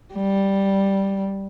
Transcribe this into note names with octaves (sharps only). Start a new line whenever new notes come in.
G3